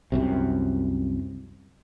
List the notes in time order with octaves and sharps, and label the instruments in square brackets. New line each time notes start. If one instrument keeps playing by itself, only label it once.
[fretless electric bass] C2 F#2 C3